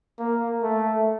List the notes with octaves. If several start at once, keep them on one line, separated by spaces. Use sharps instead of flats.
A#3
A3